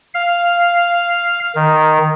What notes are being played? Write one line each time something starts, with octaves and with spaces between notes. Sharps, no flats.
F5
D#3